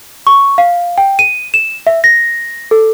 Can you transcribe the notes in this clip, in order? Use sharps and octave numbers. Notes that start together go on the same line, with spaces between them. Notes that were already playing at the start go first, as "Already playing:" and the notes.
C#6
F5
G5
D#7
E7
E5
A#6
A4